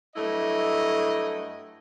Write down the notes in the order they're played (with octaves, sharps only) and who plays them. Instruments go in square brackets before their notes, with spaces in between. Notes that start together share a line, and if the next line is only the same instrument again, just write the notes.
[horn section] G2 F#3 A3 E4 D#5